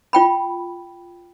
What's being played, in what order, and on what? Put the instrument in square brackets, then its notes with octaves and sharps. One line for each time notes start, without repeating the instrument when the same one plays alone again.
[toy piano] F4 G5 B5